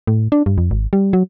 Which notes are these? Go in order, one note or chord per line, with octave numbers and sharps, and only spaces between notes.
A2
D4
G2
F2
G#1
G3
F#3